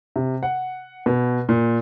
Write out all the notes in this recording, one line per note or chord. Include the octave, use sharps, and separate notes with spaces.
C3
F#5
B2
A#2